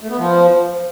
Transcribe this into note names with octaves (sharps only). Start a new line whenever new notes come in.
A3
B3
F3